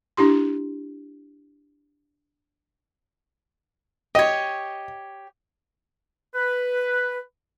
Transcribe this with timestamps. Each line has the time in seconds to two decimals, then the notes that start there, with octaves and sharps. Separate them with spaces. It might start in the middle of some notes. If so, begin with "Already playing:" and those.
0.17 D4 E4 G4 C6
4.15 G4 C#5 D#5
6.35 B4